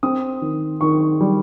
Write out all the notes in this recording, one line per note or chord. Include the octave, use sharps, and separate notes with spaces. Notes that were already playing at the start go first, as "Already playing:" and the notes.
C4 D#6
D#3
D#3 C#6
G3